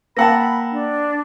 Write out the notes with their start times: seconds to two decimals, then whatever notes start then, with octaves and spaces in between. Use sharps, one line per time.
0.17 A#3 F#5 G5 A5 B5 E6 A#6
0.71 D4